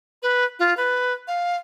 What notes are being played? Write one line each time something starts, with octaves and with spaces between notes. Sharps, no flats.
B4
F4
B4
F5